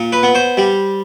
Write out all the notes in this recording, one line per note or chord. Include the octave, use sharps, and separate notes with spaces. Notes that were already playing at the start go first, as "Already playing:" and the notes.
Already playing: A#2
B4
B3
C5
G3